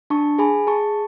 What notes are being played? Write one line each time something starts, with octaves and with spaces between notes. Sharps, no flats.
D4 A5 C#6
G#4 G#5 B5
G#4 A5 C#6